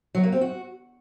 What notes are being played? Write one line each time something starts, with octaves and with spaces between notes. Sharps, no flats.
F#3
A#3
C4
F#4